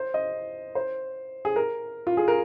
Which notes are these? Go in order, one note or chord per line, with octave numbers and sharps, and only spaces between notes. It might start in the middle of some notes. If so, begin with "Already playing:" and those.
Already playing: C5
D#5
C5
G#4
A#4
F4
G#4
A#4